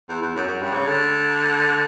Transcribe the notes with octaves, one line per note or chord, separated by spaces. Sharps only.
E2
E2
F#2
F#2
G2
C#3
D3